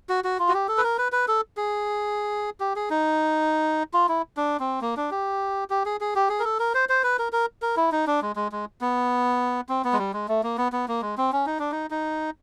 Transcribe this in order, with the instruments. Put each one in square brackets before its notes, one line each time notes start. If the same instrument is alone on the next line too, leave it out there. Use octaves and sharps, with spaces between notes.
[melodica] F#4
F#4
F4
F#4
G4
A4
B4
A#4
B4
B4
A4
G#4
G4
G#4
D#4
F4
E4
D4
C4
A#3
D4
G4
G4
G#4
G#4
G4
G#4
A#4
A4
A#4
C5
C5
B4
A#4
A#4
A#4
E4
D#4
D4
G#3
G#3
G#3
B3
C4
B3
G#3
G3
G#3
A3
A#3
B3
B3
A#3
G#3
C4
C#4
D#4
D4
D#4
D#4